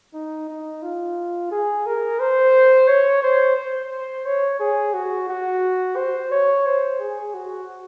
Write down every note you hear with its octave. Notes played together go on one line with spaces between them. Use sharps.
D#4
D#4
F4
G#4
A#4
C5
C#5
C5
C5
C#5
G#4
F#4
F#4
C5
C#5
C5
G#4
F#4